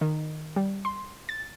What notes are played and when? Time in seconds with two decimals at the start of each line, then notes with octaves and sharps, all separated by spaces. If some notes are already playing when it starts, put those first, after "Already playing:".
0.01 D#3
0.56 G3
0.85 C6
1.29 A6